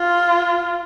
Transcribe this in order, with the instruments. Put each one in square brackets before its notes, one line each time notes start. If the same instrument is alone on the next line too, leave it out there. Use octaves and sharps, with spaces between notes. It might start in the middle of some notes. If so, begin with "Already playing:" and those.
Already playing: [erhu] F4